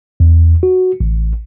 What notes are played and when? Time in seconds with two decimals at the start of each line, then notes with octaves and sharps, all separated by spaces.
0.20 E2
0.63 F#4
1.00 A1